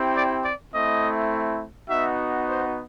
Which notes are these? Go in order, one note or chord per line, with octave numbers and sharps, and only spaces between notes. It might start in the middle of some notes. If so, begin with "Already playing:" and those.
Already playing: C4 E4 G4
D5
D5
A3 C4 E4 D#5
B3 D#4 F#4 E5
C5